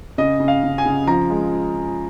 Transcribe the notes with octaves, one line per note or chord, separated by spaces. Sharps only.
C#3 D#5
C#3
F5
C#3
G#5
C#3
F3 A#5
G#3